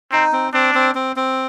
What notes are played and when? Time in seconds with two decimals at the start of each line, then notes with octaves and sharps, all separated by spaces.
0.12 C4 D#4
0.33 C4
0.54 C4 D4
0.75 C4
0.95 C4
1.16 C4